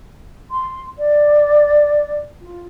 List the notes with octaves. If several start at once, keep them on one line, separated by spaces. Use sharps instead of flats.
C6
D5
F4